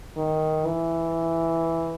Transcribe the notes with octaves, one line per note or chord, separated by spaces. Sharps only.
D#3
E3